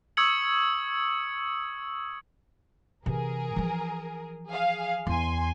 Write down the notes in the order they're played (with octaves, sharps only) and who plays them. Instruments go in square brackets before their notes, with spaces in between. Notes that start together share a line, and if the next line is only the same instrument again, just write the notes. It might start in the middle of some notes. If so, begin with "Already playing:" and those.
[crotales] C#6 D#6 E6 G#6 C#7 F#7
[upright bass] C3 E3 [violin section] G#4 A#4
[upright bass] E3 F3
[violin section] G#4 F5
[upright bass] E2 [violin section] G#5 C6